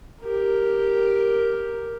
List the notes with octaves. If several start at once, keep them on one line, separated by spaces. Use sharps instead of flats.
G4 A#4